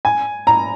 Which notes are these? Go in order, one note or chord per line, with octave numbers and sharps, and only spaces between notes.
G#5
A#5